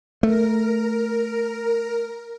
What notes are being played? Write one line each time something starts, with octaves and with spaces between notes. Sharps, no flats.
A3 A#4